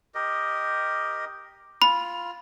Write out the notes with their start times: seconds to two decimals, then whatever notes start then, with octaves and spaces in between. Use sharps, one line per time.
0.15 G4 A#4 D#5
1.82 F4 B5